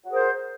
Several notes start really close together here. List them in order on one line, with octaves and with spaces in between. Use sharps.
F#4 G#4 A#4 C5